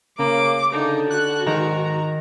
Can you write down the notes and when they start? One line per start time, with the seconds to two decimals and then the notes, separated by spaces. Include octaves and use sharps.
0.19 C#3 A#3 D6
0.73 D3 D#4
1.10 F#4 F#6
1.46 G#2 D#3 A#5